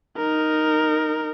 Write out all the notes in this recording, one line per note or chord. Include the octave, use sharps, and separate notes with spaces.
D#4 A#4